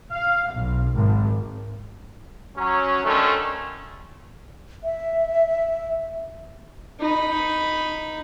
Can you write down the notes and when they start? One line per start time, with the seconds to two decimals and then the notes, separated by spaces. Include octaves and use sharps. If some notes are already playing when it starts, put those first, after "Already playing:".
0.11 F5
0.53 B1
0.93 G#1
2.56 F#3 C#4
3.04 D3 D#3 A3 C#4
4.84 E5
7.01 D#4 B5